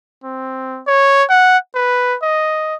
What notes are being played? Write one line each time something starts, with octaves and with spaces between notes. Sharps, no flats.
C4
C#5
F#5
B4
D#5